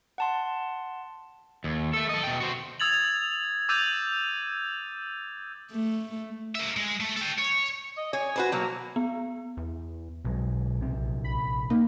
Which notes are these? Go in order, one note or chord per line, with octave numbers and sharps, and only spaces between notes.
F#5 A5 C6
D#2
A3 A4
A4 D#5
B2 G5
F#4 C5
D#6 E6 G#6 A6 F7 F#7
D6 E6 G6 A6 D#7 F7
A3
A#3 E5
G#3
A3
A4 G5
C#5
D#5
C#5 G#5
F#4 B4 C5
B2 F#3 A#3
B3
E2
B1 B2 F#3 G#3
A#1 C3 C4
B5
A#3 D#4